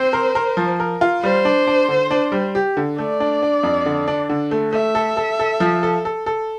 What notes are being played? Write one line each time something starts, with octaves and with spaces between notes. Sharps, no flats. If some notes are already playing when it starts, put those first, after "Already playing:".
Already playing: C4 C5
A#4
A#4
F3
A#4
F4
G3 C5
D4
D4
D3
D4
G3
G4
D3
A3 D5
D4
D4
F2
D3
D4
D3
A3
A3 E5
A4
A4
A4
F3
A4
A4
A4